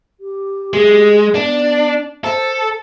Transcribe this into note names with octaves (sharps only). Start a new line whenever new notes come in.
G4
G#3
B3 D4
A4 C5